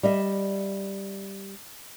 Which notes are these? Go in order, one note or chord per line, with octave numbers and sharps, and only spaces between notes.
G3 D#5 E5